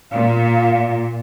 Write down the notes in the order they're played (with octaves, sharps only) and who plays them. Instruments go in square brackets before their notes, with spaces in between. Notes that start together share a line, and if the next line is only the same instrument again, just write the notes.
[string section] A#2 [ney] F5